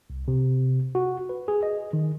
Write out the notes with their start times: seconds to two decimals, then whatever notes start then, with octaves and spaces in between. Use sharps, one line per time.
0.10 C2
0.28 C3
0.95 F#4
1.29 B4
1.48 G#4
1.63 D#5
1.93 D#3